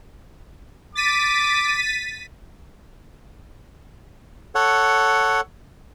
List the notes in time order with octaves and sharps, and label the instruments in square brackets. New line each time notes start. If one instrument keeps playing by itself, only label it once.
[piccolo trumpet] D6 [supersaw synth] A6 B6 D#7
[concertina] A4 C#5 F#5